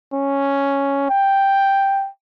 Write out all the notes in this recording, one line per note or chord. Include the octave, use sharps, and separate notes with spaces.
C#4
G5